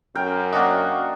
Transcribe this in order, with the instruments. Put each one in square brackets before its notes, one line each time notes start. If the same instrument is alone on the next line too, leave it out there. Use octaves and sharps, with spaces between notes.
[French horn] F#2 [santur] A#4 G5
[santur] A#3 D4 F#4 [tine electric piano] D#5 F#5 G5